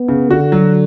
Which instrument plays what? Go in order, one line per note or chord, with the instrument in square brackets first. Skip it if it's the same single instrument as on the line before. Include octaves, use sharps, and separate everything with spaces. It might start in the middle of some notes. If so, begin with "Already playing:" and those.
Already playing: [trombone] B3
[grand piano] C#3
[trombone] D3 [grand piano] F#4
[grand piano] F#3